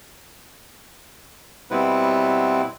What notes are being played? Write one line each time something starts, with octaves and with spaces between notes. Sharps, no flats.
B2 G3 B3 C4 E4 B4